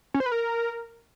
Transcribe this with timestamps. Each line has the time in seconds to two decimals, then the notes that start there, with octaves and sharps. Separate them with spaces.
0.14 C#4
0.20 C5
0.26 B4
0.32 A#4